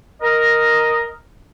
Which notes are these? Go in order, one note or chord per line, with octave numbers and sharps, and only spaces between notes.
A#4 D#5